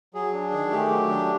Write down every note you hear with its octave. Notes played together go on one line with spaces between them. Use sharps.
F#3 G#4
D4
D#3
A3 G4
F#3
D4